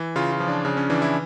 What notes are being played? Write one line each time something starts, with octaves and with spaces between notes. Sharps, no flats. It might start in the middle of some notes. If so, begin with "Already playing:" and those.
Already playing: E3
C#3 F4
F4
F3
D4
C#3 D4
C#4
E3 D4
E4